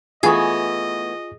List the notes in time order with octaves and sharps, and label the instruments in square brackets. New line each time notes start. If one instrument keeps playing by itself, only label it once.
[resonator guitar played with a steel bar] E3 A3 B3 [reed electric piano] F4 G#5 C#6 [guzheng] G#4 [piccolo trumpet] D#5